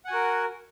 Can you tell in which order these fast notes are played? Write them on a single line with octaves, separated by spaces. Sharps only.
F#5 G#5 F#4 A#4